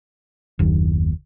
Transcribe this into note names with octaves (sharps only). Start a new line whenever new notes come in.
F#1 D#2